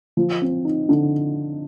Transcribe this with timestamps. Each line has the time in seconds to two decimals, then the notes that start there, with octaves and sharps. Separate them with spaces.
0.17 F3
0.42 C4
0.65 D#4
0.89 D3